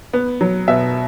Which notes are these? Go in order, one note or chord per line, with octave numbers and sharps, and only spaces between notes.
B3
F#3
B2 E5